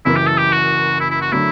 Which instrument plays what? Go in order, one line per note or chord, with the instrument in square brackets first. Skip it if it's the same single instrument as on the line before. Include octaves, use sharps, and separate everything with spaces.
[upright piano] F#1 F#2 E3 [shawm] E4
[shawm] G4
A4
G4
F#4
E4
E4
F#4
[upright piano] D3 F#3 A3 [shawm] E4